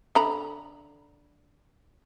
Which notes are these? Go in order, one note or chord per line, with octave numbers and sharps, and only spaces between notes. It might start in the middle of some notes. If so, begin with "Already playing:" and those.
D3 A#5 B5